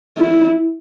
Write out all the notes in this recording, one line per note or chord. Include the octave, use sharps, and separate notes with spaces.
E4